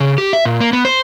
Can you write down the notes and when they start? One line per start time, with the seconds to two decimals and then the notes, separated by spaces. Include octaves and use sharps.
0.01 C#3
0.18 G4
0.33 E5
0.45 A#2
0.61 A#3
0.73 B3
0.85 C5